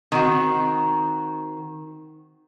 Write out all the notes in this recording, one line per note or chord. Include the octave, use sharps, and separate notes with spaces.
D#3 C4 F#4